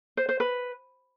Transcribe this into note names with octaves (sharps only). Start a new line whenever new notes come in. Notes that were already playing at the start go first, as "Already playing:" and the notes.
C5
C5
B4